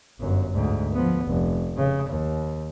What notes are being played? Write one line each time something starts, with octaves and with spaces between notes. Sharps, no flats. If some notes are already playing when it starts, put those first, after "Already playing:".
G1 F#2
D2 G#2
F3 B3
F1
C#3
D#2